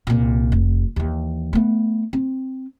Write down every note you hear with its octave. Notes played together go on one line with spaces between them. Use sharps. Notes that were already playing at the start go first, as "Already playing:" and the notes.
C2 A#2
F1
D#2 E3
A3 B3
C4